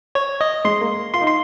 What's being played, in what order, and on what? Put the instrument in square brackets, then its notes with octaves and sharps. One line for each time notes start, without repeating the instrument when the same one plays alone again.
[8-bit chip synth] C#5
D#5
[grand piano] G#3 [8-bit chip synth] C6
[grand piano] A#3
[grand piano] F4 [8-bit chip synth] C6
[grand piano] D#4
[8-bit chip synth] C6